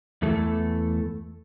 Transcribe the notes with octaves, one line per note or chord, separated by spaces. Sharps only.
E2 E3 A3 A4